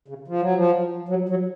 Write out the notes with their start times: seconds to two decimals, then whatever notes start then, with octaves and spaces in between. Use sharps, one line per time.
0.08 C#3
0.28 F3
0.41 F#3
0.55 F3
1.09 F#3
1.29 F#3